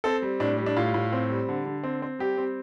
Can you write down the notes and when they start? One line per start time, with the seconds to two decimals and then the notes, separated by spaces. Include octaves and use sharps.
0.04 C4 A4
0.22 G3
0.40 A2 D4
0.58 G3
0.66 D4
0.77 A2 F4
0.94 A2
1.12 C4
1.30 G3
1.49 D3
1.66 D3
1.84 C4
2.02 C4
2.19 G3 G4
2.37 C4